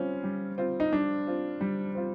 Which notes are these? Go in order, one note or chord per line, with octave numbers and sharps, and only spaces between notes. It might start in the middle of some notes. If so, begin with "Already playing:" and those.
Already playing: G3 C4 C#4 F4
G3
C4 F4
D#4
G3 D4
C4 F4
G3
C4 F4